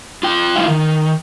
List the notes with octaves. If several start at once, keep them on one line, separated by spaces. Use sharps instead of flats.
F4 G5
G#3 E4 F4 E5
D#3